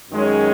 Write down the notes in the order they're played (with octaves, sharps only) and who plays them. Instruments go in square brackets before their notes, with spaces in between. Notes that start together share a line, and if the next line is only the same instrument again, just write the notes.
[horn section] F#2 D#3 G#3 C#4